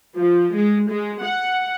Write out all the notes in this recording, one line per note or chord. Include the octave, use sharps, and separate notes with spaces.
F3
G#3
G#3
F#5